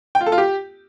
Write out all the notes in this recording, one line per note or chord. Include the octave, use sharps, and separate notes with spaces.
G5
F4
A4
F4
G4